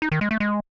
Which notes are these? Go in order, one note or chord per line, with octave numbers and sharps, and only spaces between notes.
D#4
D#3
G#3
A3
G#3